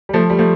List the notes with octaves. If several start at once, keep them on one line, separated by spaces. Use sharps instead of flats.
G3
F3 A3
G3
F3 A3